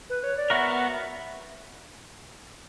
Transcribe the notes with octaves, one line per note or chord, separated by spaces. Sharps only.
B4
C#5
D5
B3 F#4 A#4 E5